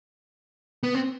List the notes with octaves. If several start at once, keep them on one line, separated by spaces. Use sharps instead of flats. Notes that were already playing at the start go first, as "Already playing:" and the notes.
B3
C4